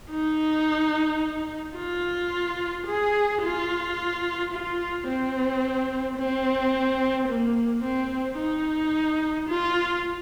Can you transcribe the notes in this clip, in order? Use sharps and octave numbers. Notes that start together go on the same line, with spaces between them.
D#4
F4
G#4
F4
F4
C4
C4
A#3
C4
D#4
F4